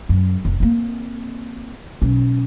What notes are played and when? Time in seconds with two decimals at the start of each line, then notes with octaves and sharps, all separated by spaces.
0.09 F#2
0.45 F1
0.60 A#3 C4
2.01 B1 C#4